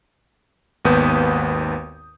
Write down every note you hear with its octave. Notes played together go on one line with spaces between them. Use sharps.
G#1 D#2 B3 B4 D#6 G6